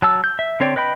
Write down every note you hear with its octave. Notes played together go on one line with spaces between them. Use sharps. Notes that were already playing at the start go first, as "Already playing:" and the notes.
F#3 A5 E6
G6
E5
D3 C4 C#5 D5 G5
B4 D#5 G5 B5